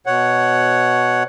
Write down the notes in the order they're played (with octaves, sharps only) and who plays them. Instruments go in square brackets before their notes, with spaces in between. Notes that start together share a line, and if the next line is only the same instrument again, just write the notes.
[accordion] B2 C#5 F#5